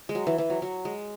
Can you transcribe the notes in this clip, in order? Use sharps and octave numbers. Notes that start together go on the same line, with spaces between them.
G#3
F#3
E3
E3
F#3
F#3
G#3